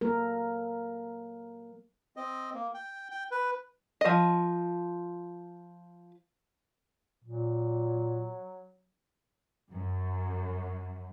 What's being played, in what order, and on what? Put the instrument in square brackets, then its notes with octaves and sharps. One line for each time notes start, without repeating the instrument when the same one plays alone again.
[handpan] F#3 A#3 A4 A#4
[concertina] C4 D#5
A#3
G5
G5
B4
[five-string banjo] F3 D#5
[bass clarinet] A#2 [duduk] F#3
[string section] F#2